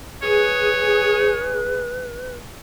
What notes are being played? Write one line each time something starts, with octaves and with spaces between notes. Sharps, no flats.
G#4 B4 C#5